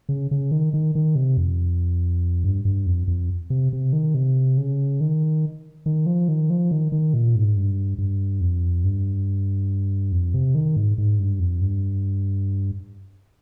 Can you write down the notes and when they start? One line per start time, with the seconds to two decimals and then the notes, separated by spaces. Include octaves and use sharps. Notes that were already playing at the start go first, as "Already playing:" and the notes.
0.09 C#3
0.31 C#3
0.51 D#3
0.74 D#3
0.95 D#3
1.15 C3
1.37 F2
2.44 G2
2.65 G2
2.86 F2
3.07 F2
3.50 C3
3.73 C3
3.93 D#3
4.14 C3
4.58 C#3
5.01 D#3
5.86 D#3
6.06 F3
6.28 D#3
6.50 F3
6.71 D#3
6.92 D#3
7.14 A#2
7.35 G#2
7.56 G2
7.98 G2
8.41 F2
8.84 G2
10.12 F2
10.34 C3
10.55 D#3
10.76 G#2
10.98 G#2
11.19 G2
11.40 F2
11.61 G2